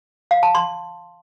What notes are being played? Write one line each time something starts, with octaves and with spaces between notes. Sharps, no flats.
F5
A5
C6